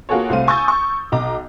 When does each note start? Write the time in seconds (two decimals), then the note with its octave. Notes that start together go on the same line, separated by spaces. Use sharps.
0.09 A#3 F4 F#4 G#4 A4 C#5
0.30 C2 A3 C5 F5 D#7
0.48 G#5 C#6 D#6 E6 G6 A6
0.68 C#6
1.12 B1 D#5 A#5 D6